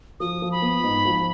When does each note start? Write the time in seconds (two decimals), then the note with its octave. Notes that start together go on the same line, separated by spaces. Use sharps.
0.20 F3 D#6
0.42 F3
0.52 B5
0.62 B3
0.83 G#2
1.05 F3